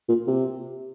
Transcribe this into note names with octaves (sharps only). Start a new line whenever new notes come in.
A#2
C3